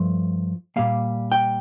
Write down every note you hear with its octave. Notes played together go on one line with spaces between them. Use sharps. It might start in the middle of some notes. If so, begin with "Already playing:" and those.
Already playing: G2 F3 A3
A#2 G3 A#3 F5
G5